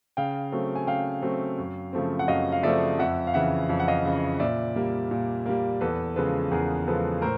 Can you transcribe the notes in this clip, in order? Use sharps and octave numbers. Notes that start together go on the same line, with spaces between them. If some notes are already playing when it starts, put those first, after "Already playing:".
C#3 F5 G5
F#3 A3 C4
G#5
C#3 F5 G5
F#3 A3 C4
F#2
C#3 F3 A3 C4
F#5
F#2 D#5 F5
F5
C#3 F3 A3 C4 D5 E5
F2 E5 F#5
F5
C#3 E3 E5 F#5
F2 F5
F#5
D#5 F5
C#3 E3
A#2 D5 E5
G3 A#3
A#2
G3 A#3
E2 A4 B4
C#3 F3 G#3 A4 B4
E2 G#4 A#4
C#3 F3 G#3 A4 B4
A2 A#4 C5